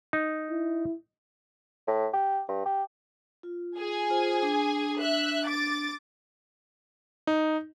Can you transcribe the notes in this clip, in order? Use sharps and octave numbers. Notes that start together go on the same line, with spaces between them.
D#4
E4
A2
G4
G2
G4
F4
G#4 G#5
F4 C5
D4
E5 F#6
D6 A6
D#4